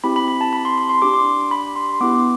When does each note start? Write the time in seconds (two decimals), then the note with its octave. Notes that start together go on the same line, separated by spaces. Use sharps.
0.04 C4 E4 G4 B5
0.16 B5
0.28 B5
0.41 A5
0.53 B5
0.65 C6
0.78 C6
0.90 C6
1.02 D4 G4 D6
1.14 C6
1.51 B5
1.76 C6
1.89 C6
2.01 B3 E4 G4 D6